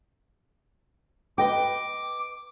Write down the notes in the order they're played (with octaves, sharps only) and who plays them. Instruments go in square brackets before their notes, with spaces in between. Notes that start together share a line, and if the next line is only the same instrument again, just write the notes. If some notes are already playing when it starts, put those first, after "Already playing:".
[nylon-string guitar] B4 D#5 G5 [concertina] D6